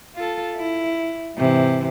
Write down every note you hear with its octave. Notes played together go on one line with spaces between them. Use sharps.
F4 A4
E4
G#2 C3 E3